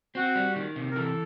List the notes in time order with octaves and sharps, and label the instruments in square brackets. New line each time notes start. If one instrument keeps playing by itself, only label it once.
[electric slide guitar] C4 [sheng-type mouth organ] F#4
[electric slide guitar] G3
D#3
C3
[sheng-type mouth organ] A#4
[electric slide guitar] E3 [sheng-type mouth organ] A4